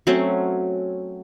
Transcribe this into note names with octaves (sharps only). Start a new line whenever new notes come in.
F#3 A3 C4 C#4